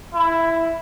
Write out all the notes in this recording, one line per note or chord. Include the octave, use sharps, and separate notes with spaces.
E4